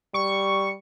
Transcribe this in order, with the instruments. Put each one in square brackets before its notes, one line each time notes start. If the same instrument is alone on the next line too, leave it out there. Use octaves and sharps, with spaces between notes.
[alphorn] G3 [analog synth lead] C#6